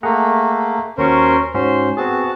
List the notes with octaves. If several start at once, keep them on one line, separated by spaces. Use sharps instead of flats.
A3 A#3 G#4 F#5 A#5
D#2 C#4 F#4 A#4 C5 C#6
G#2 C#4 F#4 C5
B3 C4 F#4 G#4 A5